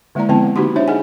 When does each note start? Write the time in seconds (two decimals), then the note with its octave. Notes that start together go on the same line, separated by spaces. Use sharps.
0.15 D3 G#3 A#3 E4 D5 A#5
0.29 D3 F3 B3 C4 E4 A5
0.42 F#5
0.56 D3 A#3 D#4 F#4 G4 C6
0.76 D4 E4 C5 C#5 E5
0.88 D#4 G#4 D#5 F#5 G#5